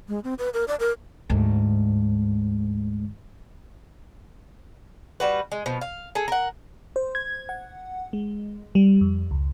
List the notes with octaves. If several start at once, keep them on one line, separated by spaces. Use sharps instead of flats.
G#3
C4
B4
A#4
D5
A#4
D2 G#2
G3 F#4 B4
G#3
B2 F3
F5
G#4 A4
A#4 F#5
C5
G#6
F#5
G#3
G3
F2
C#2